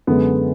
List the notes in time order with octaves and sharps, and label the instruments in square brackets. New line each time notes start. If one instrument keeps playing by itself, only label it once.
[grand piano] F#2 D3 G#3 B3